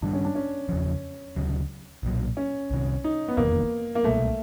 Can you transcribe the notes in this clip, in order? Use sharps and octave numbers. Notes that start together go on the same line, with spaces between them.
G2 D#3 G3 D4
C#4
D4
C#4
E2 C#3 F3
D2 C#3 F#3
B1 A#2 F#3
C#4
C2 C3 D#3
D#4
B3
F1 E2 C3 D#3 A#3
A#3
C2 B2 G3 A3 B3